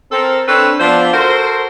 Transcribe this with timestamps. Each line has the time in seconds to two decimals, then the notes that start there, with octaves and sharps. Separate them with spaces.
0.12 C4 A4 A#4
0.48 C4 D4 A4 B4 C#5
0.80 F3 B3 D4 C5 D5 E5
1.13 F#4 A4 A#4 C5